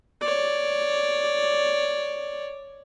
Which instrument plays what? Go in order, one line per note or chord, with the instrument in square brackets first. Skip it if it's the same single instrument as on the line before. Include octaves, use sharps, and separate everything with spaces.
[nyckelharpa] C#5 D5